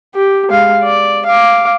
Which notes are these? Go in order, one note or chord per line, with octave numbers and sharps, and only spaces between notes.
G4
G#3 F5
D5
F5 D6